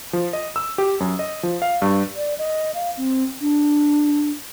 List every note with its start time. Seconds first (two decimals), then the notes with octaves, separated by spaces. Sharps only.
0.13 F3
0.33 D#5
0.56 E6
0.78 G4
1.00 F#2
1.19 D#5
1.43 F3
1.62 F5
1.82 G2
2.16 D5
2.38 D#5
2.75 F5
2.97 C4
3.41 D4